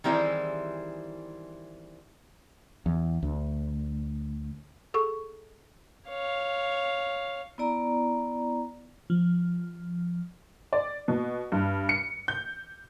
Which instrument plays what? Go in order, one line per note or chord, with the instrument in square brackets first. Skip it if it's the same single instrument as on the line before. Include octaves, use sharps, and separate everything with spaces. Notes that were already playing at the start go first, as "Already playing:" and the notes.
[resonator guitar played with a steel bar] D#3 E3 G3 C4 E4 G#4
[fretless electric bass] E2
D2
[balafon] G#4 A4 C#6
[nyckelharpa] C#5 F5
[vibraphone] B3 E4 D5 A#5
[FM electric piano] F3
[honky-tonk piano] D5
B2
G2
C#7
G6